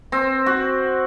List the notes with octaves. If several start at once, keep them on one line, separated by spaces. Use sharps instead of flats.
C4
F#4